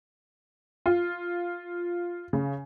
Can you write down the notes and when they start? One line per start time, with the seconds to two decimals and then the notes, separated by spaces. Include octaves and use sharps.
0.86 F4
2.33 C#3